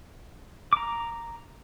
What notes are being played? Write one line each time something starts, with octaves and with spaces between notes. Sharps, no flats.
A#5 D6